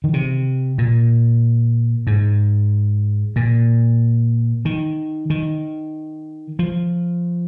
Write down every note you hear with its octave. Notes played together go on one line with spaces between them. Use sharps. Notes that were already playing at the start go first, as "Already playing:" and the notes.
D#3
C3
A#2
G#2
A#2
D#3
D#3
F3